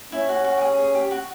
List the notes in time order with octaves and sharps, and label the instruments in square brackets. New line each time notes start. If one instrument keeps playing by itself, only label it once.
[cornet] C#4 [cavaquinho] E4
[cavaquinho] F#4
F#4
G4
G#4
G#4
G4
F#4